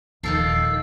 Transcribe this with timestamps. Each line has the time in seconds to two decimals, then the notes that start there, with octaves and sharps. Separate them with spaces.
0.23 D#1 D#3 F3 D4 A4 E6 C7